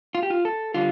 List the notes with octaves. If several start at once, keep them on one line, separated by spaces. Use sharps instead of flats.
F4
G4
F4
A4
D3 G3 F4